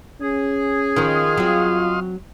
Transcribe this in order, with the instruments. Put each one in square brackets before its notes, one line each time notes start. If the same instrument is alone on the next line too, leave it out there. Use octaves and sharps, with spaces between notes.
[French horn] C#4 [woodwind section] G#4
[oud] D#3 F3 [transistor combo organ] D#5 F5 C6
[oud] F#3 C4 [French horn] F4